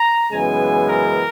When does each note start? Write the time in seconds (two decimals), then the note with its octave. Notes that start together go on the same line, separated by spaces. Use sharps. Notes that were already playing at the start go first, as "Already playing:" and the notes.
Already playing: A#5
0.31 F#2 C#3 E3 G#3 B3 G#5
0.88 A#4